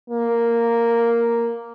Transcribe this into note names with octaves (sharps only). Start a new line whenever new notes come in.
A#3